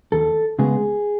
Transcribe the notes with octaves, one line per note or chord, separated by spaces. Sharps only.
D#2 A4
C#3 G#3 B3 G#4